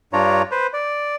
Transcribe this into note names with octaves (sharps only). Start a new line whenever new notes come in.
G2 D4 F4 C#5 A#5
B4 C5
D5